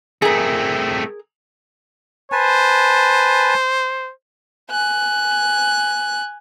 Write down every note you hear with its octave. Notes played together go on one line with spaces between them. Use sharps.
A3 C4 G#4 A#4
B4 C5 G#5 A5
G#5 F#6